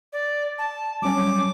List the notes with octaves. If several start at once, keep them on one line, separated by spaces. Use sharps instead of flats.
D5
A5
F#3 G3 C#4 D6